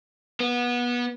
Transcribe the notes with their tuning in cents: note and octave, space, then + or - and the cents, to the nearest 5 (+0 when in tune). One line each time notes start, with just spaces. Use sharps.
B3 -25